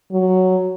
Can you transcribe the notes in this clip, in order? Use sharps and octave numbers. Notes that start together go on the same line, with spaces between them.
F#3